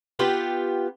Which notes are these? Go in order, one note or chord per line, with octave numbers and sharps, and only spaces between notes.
B3 F4 G4